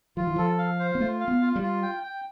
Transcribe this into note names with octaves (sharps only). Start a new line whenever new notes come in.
F3 F4
E3
F3 A4
F5
C5
B3
A3 F4
F5
B3
F4
G3
F4
G5
G5